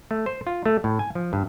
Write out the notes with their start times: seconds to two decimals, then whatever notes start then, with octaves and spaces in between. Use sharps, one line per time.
0.11 A3
0.26 C5
0.47 F4
0.66 A3
0.84 A2
0.99 G#5
1.15 F3
1.33 G2